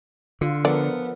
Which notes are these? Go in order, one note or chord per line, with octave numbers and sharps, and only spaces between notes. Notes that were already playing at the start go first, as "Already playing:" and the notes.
D3 F4
F3 B3 A4 A#4 D5